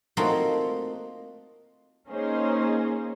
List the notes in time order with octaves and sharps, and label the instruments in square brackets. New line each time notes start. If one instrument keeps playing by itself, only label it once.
[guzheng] A3 A#3 C4 D#4 F4 F#4
[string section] A#3 C#4 D#4 G#4 C5